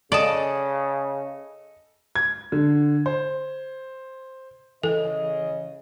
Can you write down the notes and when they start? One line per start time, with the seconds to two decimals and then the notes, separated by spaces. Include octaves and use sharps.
0.12 C#3 A4 D5 D#5 A5 D#6
2.16 G#6
2.52 D3
3.06 C5
4.83 C#3 E3 A4 D#5